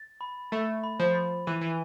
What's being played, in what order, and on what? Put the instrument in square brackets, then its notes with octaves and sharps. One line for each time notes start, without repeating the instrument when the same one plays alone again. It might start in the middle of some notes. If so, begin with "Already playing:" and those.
Already playing: [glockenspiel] A6
B5
[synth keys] A3 [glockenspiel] A6
[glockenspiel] B5
[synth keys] F3
[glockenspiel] B5
[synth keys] E3 [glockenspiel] D#7
[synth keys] E3